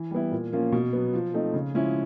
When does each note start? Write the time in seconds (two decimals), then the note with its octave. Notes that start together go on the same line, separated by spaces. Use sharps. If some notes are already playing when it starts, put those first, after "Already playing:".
Already playing: E3
0.11 G3 B3 E4
0.31 A#2
0.52 F3 A#3 C#4 F4
0.72 B2
0.93 F#3 B3
1.14 F3
1.34 A3 C4 D#4
1.54 C#3
1.74 F3 G#3 C#4 E4